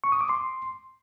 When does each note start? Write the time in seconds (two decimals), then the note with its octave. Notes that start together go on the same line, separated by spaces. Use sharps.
0.04 C#6
0.12 D#6
0.21 D6
0.29 C6